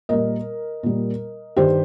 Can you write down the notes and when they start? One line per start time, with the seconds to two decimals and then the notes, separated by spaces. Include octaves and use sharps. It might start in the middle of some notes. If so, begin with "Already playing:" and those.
0.09 A#2 G3 A#4 D#5
0.83 A#2 G3
1.57 G2 D#3 G3 G4 C5